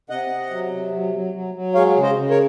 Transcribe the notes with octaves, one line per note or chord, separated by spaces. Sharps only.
C3 D#5 F#5
C3
F#3
C3
F#3
F#3
F#3
F#3
G#3 C#5 F5
C#3
C5 D#5
C#3
A#4 C#5